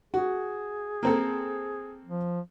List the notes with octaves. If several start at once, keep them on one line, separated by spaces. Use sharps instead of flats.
F#4 G#4
A#3 C4 A4
F3